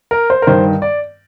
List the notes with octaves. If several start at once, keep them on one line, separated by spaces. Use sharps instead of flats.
A#4
C5
A#4
G2 D#3 C5
D5